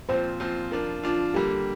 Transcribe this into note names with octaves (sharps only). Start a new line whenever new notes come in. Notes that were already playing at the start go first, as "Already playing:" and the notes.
A#2 F3 C4 F4 C5
A#2 F3 C4 F4
F3 D4 F4 A#4
F3 D4 F4
D3 G3 A#3 G4